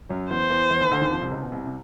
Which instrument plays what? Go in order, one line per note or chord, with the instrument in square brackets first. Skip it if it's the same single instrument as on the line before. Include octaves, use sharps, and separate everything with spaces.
[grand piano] F#2 F#3
[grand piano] E2 E3 [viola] C5
[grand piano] E2 E3
E2 E3
D#2 D#3
D2 D3
D#2 D#3
F2 F3
C2 C3
C#2 C#3
B2
C2 C3
C3